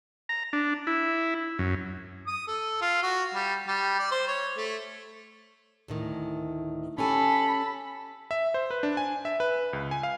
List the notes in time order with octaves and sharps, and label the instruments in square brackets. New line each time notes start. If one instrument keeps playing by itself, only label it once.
[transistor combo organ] A#5
D4
E4
F#2
[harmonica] D#6
A4
F4
F#4
G3
G3
D5
C5
C#5
A3
[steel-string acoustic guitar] D2 A2 D#3
[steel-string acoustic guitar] C#4 G4 G#5 [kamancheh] A4 B5
[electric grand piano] E5
C5
B4
D4
G#5
E5
B4
C#2
G#5
F5